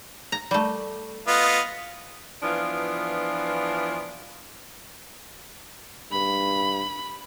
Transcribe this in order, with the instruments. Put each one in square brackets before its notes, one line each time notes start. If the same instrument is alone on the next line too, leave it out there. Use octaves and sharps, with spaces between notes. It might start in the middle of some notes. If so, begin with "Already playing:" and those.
[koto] A#5
G3 A3
[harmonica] B3 F4 D#5
[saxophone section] E3 F3 B3 D4 F4
[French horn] G2 [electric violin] B5